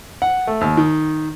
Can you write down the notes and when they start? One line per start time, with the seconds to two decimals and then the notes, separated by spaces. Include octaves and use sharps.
0.22 F#5
0.47 A3
0.61 D#2
0.77 D#3